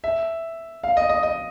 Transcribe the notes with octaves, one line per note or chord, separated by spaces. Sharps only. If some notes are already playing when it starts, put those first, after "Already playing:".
E5
F5
D#5
D#5
D#5